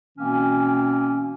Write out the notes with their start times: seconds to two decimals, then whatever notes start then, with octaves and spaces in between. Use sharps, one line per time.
0.18 B2 E3 A#3 C4 C#4